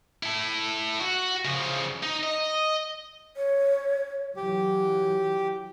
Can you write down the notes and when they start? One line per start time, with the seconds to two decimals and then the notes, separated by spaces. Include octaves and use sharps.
0.23 E4 A4
1.00 F#4
1.45 C#3 F3
2.03 D#4
2.23 D#5
3.36 C#5
4.36 E3 F#3 G4